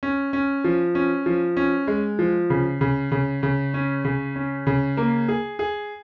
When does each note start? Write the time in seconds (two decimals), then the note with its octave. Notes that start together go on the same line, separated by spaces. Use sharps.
0.03 C#4
0.33 C#4
0.64 F3
0.95 C#4
1.26 F3
1.57 C#4
1.88 G#3
2.19 F3
2.50 C#3
2.81 C#3
3.12 C#3
3.43 C#3
3.74 C#4
4.05 C#3
4.36 C#4
4.67 C#3
4.97 A#3
5.28 G#4
5.59 G#4